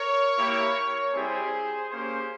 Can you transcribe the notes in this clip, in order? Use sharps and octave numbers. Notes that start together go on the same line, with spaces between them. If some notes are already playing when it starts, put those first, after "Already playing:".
Already playing: A#4 C#5
A#3 E4 G4
G3 C4 E4 G4 G#4 C5
A#3 C#4 G4 G#4 C5